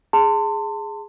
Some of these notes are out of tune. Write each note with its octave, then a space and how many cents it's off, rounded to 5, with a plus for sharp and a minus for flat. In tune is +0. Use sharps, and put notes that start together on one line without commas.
G#4 -5 A5 +30 C6 -15